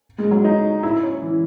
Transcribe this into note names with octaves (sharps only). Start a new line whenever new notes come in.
G#3
F#3
D#4
E4
C#4
E3